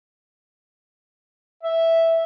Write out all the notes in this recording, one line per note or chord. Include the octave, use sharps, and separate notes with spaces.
E5